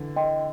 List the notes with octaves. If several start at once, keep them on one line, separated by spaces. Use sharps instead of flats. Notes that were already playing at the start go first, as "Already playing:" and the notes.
Already playing: D3 E3
D#5 G5 C6